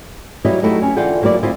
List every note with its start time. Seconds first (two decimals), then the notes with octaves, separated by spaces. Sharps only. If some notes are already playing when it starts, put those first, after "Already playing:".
0.45 F#3 G3 E4 B4 C#5 D#5
0.62 F#3 A3 D#4 E4 F#4 G4
0.82 C#4
0.97 D3 E3 F4 F#5 G5
1.22 F#3 A#3 C4 E4 D5
1.43 D2 C4 E4 F4 D#5